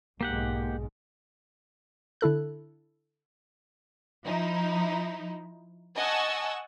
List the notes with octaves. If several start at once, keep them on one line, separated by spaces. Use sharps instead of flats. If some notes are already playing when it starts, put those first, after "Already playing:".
B1 G#2 G#3 A#3 G4 F#5
D3 E4 A4 F#6
F3 D#4 E4
D#5 F#5 G#5 A5 C#6 E6